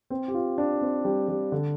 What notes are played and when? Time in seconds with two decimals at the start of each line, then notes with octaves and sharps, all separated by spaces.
0.10 C4
0.28 G4
0.34 F4
0.58 D4
0.81 C4
1.05 G3
1.28 G3
1.52 D3